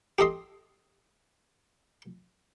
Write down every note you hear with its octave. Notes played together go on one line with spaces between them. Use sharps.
G4 A4 D#5 C6